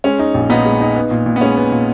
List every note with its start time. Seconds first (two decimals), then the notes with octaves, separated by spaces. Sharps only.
0.04 G#3 C#4
0.19 D#4
0.34 A#1
0.50 A#2 B3 D#4
0.66 G#3
0.81 D#4
0.96 B3
1.11 A#2
1.26 A#2
1.36 B3
1.41 G#3 C#4
1.57 B3
1.72 A#2